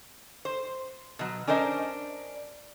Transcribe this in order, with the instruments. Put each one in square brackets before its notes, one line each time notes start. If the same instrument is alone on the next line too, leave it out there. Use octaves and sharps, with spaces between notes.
[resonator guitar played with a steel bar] C5
B2 F#3
C#4 D4 A#4 C5 D#5